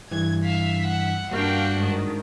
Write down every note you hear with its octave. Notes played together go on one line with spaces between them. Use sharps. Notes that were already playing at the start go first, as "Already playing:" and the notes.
G2 E3 G#6
E5 F5 B6
F#5
G2 A#3 D4 F#4 F5 G5
G#2 D#3